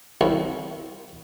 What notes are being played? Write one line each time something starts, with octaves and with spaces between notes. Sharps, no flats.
C2